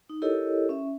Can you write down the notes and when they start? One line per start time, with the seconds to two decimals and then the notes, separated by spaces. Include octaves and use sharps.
0.10 D#4
0.22 E4 G4 A4 A#4 C#5 D#5
0.69 C#4 E5